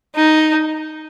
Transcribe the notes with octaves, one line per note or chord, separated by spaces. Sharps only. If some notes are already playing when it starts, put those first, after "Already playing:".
D#4